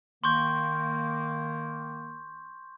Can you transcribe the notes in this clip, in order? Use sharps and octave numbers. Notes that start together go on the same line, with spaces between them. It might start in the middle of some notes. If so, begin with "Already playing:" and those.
D#3 A#3 C6 C#6 G6